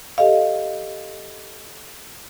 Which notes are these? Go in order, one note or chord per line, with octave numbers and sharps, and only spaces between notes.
G4 A4 D#5 F5